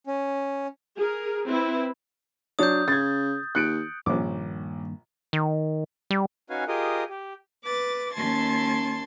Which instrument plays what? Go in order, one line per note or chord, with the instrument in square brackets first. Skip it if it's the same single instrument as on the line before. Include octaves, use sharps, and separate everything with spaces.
[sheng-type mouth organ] C#4
[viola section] G#4 A#4
C4 E4 B4
[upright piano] F#3 D4 C#5 [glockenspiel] D#6 G6
[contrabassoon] C#3 [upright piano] G#6 A6
[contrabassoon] D#2 [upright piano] F#6 C#7 D7
[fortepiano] A#1 C#4 D6 [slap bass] G2 D#3 A#3
[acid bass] D#3
G3
[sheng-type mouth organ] C#4 D#4 F#4 B4 F5 G#5
F4 G4 G#4 A#4 D#5
G4
[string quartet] B4 D6 A6
D#2 C#4 A5 C6 G#6 A6